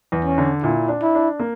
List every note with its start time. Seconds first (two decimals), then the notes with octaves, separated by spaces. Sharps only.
0.12 E2
0.25 C#4
0.38 D3
0.63 A#2 E4
0.88 D4
1.02 E4
1.15 D4
1.40 A#3